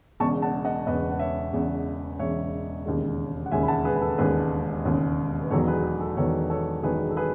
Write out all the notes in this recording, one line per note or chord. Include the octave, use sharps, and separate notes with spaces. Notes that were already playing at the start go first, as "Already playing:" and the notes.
E1 E2 C#3 A5 C#6
F#5 A5
D#5 F#5
E1 E2 C#3 B4 D#5
F#5
C#5 E5
E1 E2 C#3
E1 E2 C#3 C#5 E5
E1 D#2 C#3 G#3
F#5
E1 D#2 C#3 G#3 E5 G#5
B5
F#5 A5
G#4 B4
B4
A4
E1 D#2 C#3 G#3 G#4 B4
E1 D#2 C#3 G#3
B4
E1 E2 D#3 F#3 B3 A4 C#5
G#4 B4
G#4
A4
E1 E2 D#3 F#3 B3 A4 C#5
A4 C#5
E1 E2 D#3 F#3 B3 G#4 B4
A4
G#4 B4